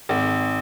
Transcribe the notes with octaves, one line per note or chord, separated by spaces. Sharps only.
G#1